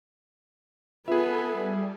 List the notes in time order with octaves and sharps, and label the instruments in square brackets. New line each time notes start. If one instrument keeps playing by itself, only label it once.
[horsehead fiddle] B3 B4 [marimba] F4 [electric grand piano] G#4 E5 [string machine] A4 G#5
[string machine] G3